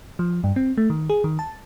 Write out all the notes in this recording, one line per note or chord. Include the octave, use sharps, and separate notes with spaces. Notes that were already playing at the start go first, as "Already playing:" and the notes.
F3
G2
C4
A3
D#3
G#4
D#3
A5